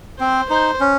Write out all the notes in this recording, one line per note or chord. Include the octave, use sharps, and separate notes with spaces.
C4 C5
D#4 C5
C#4